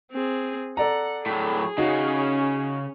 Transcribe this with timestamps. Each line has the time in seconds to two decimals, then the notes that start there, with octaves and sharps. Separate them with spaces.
0.12 C4 G#4
0.77 A4 D5 F#5 A#5
1.26 A2 F#3 G#4
1.78 C#3 C#4 D#4 F#4